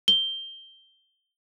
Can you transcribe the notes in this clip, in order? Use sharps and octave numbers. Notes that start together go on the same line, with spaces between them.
G7